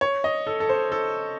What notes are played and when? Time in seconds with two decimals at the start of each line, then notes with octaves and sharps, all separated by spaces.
0.01 C#5
0.24 D#5
0.47 A4
0.60 A4
0.69 C5
0.92 A4